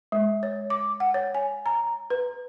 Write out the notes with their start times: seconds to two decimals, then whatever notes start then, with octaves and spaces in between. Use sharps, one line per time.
0.12 G#3
0.43 C#5
0.70 D6
1.00 F#5
1.14 C#5
1.35 G#5
1.66 A#5
2.10 B4